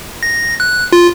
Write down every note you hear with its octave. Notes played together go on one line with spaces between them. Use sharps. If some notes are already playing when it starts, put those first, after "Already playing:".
A#6
F#6
F4